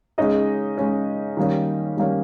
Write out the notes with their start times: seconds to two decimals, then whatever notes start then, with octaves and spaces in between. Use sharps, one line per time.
0.18 C#3 G#3 C#4 D#4 D#5
0.77 C#3 G#3 C#4
1.37 D#3 G3 A#3 C#4
1.97 D#3 G3 A#3 C#4